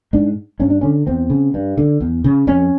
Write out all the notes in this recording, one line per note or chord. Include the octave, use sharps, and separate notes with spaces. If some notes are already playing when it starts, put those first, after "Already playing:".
G#2 D4
G2 C#4
D4
D3 C#4
E2 C4
C#3
G2
D3
E2
C#3
F2 C#4